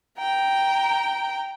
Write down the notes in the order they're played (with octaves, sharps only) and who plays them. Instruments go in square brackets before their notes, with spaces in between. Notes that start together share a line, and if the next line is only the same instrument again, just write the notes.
[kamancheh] G5 A#5